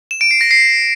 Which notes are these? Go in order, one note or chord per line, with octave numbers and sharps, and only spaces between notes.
E7
D7
C7
A#6
C7